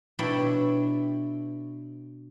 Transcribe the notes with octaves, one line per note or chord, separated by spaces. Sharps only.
B2 D4 E4 C#5 D5 G5